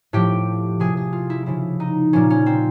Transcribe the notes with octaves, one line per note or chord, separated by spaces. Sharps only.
A2 F3 G4
C3 F3 G#4
G#4
F4
E4
C#3 F3 E4
D#4
A#2 F3 C#4
C#4
C4